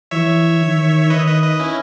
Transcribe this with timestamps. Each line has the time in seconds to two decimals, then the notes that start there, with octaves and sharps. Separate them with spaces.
0.11 E3 C#5 E5
0.61 D#3
1.10 D#3 B4 D#5
1.27 B4 D#5
1.43 B4 D#5
1.60 C#4 E4